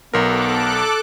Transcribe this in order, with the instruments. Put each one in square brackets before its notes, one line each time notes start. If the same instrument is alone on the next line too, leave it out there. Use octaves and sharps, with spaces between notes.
[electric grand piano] B1 A#4 [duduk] B3 [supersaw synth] A4 D6 F#6